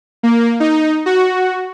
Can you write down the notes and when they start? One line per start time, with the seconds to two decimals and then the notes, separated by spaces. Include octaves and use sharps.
0.23 A#3
0.60 D#4
1.06 F#4